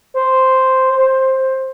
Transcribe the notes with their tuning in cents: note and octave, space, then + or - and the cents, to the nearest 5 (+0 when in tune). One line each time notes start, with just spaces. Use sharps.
C5 -5
C5 +10